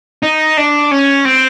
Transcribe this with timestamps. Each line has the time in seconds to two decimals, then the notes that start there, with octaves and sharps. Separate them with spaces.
0.23 D#4
0.57 D4
0.91 C#4
1.25 C4